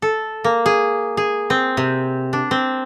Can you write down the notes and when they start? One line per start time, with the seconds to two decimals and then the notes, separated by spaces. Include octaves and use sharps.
0.02 A4
0.44 A#3
0.66 G#4
1.17 G#4
1.50 C4
1.77 C3
2.33 D4
2.51 C4